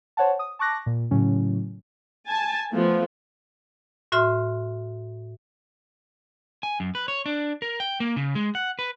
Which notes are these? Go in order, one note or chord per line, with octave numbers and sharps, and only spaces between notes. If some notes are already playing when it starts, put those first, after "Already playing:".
C5 C#5 F#5 A5
D#6
A5 C#6 D6 F#6 A#6
A#2
A2 C#3 F#3 C#4
G#5 A5
F3 A3 B3
A2 F#4 E5 C6 F6
G#5
F#2
B4
C#5
D4
A#4
G5
A#3
C#3
G#3
F#5
B4